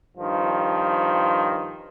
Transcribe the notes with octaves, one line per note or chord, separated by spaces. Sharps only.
G2 D#3 F3